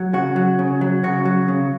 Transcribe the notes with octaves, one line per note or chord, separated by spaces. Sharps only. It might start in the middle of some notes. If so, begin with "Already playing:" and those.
Already playing: F#3
C#3 F#4
F#3
C#3
F#3
C#3 F#4
F#3
C#3